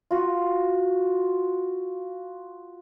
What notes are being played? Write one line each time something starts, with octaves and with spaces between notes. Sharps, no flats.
F4 F#4